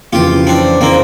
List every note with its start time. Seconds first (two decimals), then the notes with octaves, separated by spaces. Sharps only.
0.12 F2 C#3 E3 F4 G4
0.47 C4 D4
0.81 C#3 E3 A#3 C4